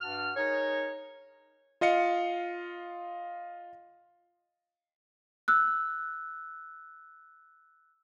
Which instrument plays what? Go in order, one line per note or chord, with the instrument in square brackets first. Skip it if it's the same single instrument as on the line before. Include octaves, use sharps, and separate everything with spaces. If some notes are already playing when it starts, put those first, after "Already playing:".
[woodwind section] G2 F#4 A5 F6
D#4 G#4 A#4 C#5
[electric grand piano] F4 D#5 F5 C#7
[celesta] E6 F#6